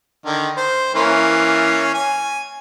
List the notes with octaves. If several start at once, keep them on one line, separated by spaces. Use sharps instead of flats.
D3 D#3
C5
E3 A#3 C#4
G#5